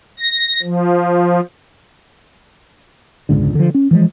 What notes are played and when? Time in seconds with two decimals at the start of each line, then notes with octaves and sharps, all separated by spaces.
0.19 A#6
0.63 F3
3.29 E1 C#2 G#2 D3
3.55 D3 F3
3.74 C#4
3.91 E3 F3 G#3